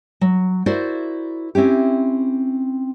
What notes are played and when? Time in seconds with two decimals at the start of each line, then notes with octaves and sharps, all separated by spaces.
0.21 F#3
0.66 E4 F#4 A#4 C5 D5
1.55 C4 C#4 E4 G4